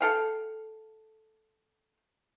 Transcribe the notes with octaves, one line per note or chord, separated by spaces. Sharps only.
A4 F5 G5